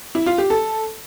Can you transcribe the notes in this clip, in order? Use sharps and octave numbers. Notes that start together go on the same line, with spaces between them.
E4
F4
G4
A4